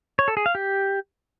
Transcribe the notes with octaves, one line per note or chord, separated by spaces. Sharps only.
C#5
A4
G#4
F5
G4